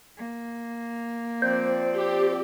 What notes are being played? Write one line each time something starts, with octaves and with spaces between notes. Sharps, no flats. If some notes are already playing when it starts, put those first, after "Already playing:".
A#3
F3 C4 C5 D5
G4